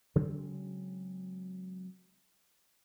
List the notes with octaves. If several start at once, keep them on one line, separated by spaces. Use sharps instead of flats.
C#3 F#3 G#3 C4